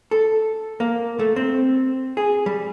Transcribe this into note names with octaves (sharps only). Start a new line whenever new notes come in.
A4
A#3
A3
C4
G#4
G3